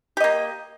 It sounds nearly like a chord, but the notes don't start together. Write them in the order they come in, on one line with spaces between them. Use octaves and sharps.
G4 D#5 A#3